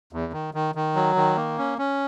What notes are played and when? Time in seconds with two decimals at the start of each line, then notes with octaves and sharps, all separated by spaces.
0.13 E2
0.33 D#3
0.54 D#3
0.75 D#3
0.95 F#3
1.16 D#3
1.36 A#3
1.58 C#4
1.78 C#4